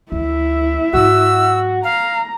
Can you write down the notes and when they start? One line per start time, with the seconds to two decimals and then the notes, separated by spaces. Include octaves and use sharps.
0.12 D2 E3 E4 E5
0.93 G#2 F#3 F#4 E6
1.84 F5 A#5